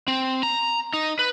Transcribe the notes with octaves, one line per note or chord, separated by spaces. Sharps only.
C4
A#5
D#4
B4